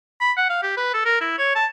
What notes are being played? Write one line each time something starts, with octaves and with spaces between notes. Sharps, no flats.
B5
F#5
F5
G4
B4
A4
A#4
E4
C#5
A5